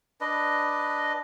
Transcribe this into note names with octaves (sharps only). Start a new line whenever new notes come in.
D4 B4 D#5